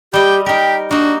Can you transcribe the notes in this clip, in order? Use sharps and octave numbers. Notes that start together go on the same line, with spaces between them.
G3 G4 D#5 G5
D#4 G4 A#4 G5
A#3 D4 D#4 F#4